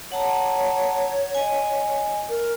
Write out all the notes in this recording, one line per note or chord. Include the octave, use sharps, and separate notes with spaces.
C#5 F#5 A5 A#5
D#5 G#5
A#4